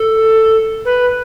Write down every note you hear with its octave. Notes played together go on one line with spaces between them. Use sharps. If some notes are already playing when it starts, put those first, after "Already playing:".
Already playing: A4
B4